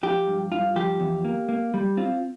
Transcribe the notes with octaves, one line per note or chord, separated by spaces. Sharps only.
F3 G4
G2
G2 F4
F3 G4
E2
A#3
A#3
G3
C4 F4